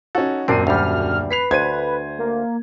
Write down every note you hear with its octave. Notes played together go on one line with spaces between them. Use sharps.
C#4 D#4 F#4 A4
D#1 F#2 C4 D4 A#4 C7 D#7
D2 G3 F6
B4 B6 C7 F7
D2 C5 G#6 D#7
A#3